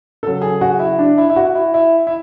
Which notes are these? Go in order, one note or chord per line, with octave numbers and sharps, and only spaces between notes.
C#3 F#3 A4
G#4
F#4
E4
D4
E4
E4
F#4
E4
E4
E4